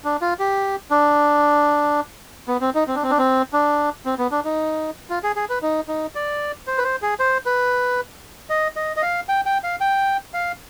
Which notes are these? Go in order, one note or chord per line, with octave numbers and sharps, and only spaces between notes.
D4
F4
G4
D4
B3
C4
D#4
C4
D4
C4
D4
C4
D4
C4
B3
D4
D#4
F4
G#4
G#4
B4
D#4
D#4
D5
C5
B4
C5
G#4
C5
B4
D#5
D#5
D#5
F5
G5
G5
F5
G5
F5